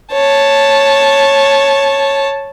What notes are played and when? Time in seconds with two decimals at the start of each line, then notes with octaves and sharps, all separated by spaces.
0.12 C#5 A5